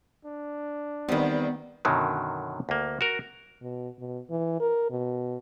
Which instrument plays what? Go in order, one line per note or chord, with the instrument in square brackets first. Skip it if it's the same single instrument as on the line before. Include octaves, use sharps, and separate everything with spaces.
[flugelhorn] D4
[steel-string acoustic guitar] E2 G3 [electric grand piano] D#3 C4 [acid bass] B3
[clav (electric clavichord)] F#2 B2 D3 D#3 F#3
D2 A#3
F#4 A#4
[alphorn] B2
B2
E3
A#4
B2